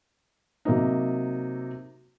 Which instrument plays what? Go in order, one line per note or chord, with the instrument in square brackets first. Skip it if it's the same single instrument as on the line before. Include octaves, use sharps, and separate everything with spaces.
[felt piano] C3 F#3 A#3 C4 D#4